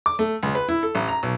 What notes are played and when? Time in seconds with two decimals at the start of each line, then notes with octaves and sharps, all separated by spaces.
0.06 D6
0.19 A3
0.43 C#2
0.55 B4
0.69 E4
0.83 A4
0.95 A1
1.08 A#5
1.23 B1